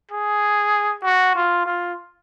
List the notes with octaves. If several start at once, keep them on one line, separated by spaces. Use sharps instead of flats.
G#4
F#4
F4
F4